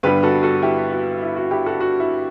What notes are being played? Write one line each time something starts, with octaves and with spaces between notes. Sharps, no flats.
G2 D3 G3 B3 G4 B4
F#4 A4
F#4 A4
E4 G4
F#4
E4
F#4
E4 G4
F#4 A4
F#4
E4